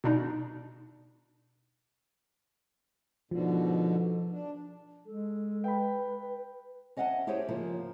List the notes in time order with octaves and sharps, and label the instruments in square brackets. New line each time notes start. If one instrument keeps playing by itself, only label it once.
[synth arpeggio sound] B2 D4 D#4
[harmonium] G#2 B2 D3 [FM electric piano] F3
[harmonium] D4
[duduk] G#3 [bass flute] A4
[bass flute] B4 [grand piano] G5 B5
[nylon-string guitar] C#4 D#5 E5 F#5 G#5 A5
E4 G4 G#4 C5 C#5
C#3 F3 A#3 F4